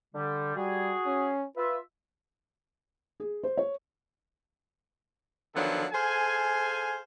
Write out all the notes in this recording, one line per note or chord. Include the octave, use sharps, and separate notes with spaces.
D3 G3
G3 F#4 G#4
C#4
F4 B4 E5
G#4
C5
C#5
D3 D#3 F3 F#3 B3 A4
G#4 A4 C5 F5 G#5